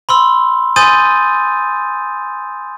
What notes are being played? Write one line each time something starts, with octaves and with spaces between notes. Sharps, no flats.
B5 C6 E6
G#5 C6 D#6 G6 A6 D#7